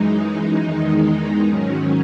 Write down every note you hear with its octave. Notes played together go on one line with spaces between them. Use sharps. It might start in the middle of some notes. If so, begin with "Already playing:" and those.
Already playing: F#2 E3 G#3 D#4
E2 D#3 G#3
G#2 D#3 F#3 C#4